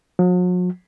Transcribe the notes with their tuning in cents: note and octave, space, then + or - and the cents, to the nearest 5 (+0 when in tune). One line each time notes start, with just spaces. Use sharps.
F#3 -45